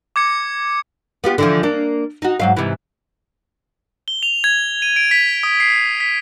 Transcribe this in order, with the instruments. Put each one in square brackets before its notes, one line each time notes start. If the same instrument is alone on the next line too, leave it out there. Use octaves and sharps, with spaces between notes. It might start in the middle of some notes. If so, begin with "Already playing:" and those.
[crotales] D6 G#6 C#7
[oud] B3 F4 G4
D3 E3 F3
A#3 D4
D#4 F#4
G#2 F#3 F5
G#2 C3 E3
[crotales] G7
F7
G#6
D#7
D7
B6
D#6
C7
B6